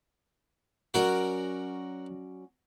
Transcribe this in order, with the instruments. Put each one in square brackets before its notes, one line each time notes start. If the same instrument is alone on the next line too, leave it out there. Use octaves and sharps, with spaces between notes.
[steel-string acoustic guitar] F#3 C#4 D5 [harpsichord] F#4 A#4